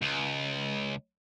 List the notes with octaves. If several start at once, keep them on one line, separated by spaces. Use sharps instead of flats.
C#2